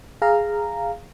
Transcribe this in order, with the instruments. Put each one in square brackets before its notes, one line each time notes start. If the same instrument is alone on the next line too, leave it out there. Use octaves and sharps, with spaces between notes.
[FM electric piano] G#4 F5 A#5